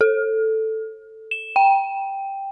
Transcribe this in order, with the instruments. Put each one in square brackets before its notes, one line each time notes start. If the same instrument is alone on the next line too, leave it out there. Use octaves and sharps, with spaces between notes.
[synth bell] A4
E7
G5